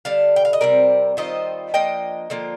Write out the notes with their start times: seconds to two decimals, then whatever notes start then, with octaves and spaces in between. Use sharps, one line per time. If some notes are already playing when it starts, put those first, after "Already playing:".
0.05 D3 G3 F5 A5
0.36 G5
0.45 F5
0.53 D#5
0.61 C3 G3 C4 A#4 D5
1.17 D#3 G3 C4 F4 C5 D#5
1.74 F3 A#3 D4 D#5 G5
2.30 D3 F3 A#3 F4